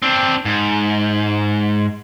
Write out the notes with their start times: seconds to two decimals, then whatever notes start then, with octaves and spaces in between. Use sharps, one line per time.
0.03 C4 D4
0.45 G#2